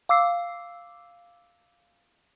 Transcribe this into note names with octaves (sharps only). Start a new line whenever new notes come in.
F5 D6 E6 C7